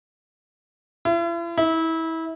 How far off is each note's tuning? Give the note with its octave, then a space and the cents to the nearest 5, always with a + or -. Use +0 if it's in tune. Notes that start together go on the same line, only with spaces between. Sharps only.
E4 +45
E4 -25